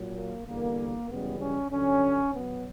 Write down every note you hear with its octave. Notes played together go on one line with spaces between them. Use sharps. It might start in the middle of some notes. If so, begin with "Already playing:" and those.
Already playing: A#2 F#3
A#3
E2 D3 G3 A#3
F#2 C#3 E3 G3 B3
C#4
G2 D3 F#3 C#4
B2 F#3 B3